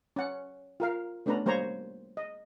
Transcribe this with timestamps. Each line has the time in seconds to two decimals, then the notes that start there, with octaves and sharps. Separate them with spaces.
0.16 C#4 F#5
0.80 F4 A#4 F5
1.26 A3 B3 C#4 D4 B4 A#5
1.46 G3 A#3 C5 C#5 A#5
2.17 D#5